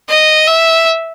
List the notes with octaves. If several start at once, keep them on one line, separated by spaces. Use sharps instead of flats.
D#5
E5